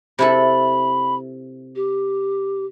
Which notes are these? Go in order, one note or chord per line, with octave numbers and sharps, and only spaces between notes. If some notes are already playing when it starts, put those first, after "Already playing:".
C3 E4 A4 B5
G4